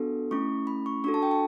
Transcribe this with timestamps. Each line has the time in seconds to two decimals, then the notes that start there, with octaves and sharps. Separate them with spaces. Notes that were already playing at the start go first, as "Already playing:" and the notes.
Already playing: B3 D4 F#4 A4
0.31 A3 C#4 E4 C#6
0.67 B5
0.86 C#6
1.04 D4 F#4 A4 C#6
1.14 A5
1.22 G5
1.31 A5